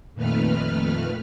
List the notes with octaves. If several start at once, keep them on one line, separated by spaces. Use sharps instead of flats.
F2 A#2 D#3 A3 B4 F6